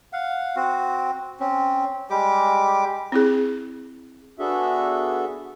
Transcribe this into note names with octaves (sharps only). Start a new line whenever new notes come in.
F5 F#5
C4 F#4
C4 C#4
G3 G#3 G4 D6
C4 E4 G#4
B3 D4 F#4 G#4 A4 E5